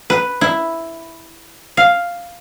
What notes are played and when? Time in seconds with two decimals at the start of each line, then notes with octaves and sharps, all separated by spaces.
0.10 B4
0.41 E4
1.77 F5